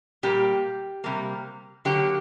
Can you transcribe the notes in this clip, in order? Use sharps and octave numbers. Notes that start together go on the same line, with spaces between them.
A#2 G3 A#3 G4
C3 G3 A#3
D3 F#3 A#3 G4